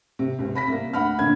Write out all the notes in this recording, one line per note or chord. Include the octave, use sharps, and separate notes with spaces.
C3
C#2 C3
B5 A#6 B6
C2 A#3
D2 F#5 B5 F6
A#1 D3 A#3 G#6